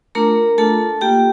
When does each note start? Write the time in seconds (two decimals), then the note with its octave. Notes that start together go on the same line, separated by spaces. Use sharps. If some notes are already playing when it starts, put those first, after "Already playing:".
0.15 A3 D4 F4 A#4 A#5
0.58 A3 D4 F4 A4 A5
1.01 A#3 F4 G4 G5